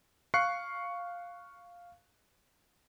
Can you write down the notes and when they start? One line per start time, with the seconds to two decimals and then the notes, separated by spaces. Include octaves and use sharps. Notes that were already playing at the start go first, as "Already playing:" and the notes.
0.34 F5 C#6 F#6 C7 C#7